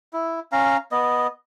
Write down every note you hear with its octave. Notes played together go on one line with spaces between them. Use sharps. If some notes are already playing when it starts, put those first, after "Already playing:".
E4
C#4 F5 A#5
B3 D#5